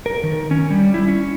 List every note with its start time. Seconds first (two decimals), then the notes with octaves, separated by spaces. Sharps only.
0.06 A#4
0.23 D#3
0.51 C#4
0.71 G3
0.94 E4
1.08 C#4